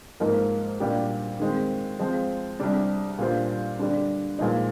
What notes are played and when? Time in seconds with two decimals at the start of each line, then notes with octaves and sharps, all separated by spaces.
0.20 G#2 F3 A#3 D#4 A#4
0.80 A#2 G3 D4 G4
1.40 D#3 G#3 C4
1.99 F3 G#3 C4
2.60 C2 C3 G3 D4
3.19 A#2 G3 D4 F4 C5
3.79 D3 G3 D4
4.39 A#2 F3 G#3 D#4